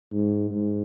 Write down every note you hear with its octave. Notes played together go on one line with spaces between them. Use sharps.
G#2
G#2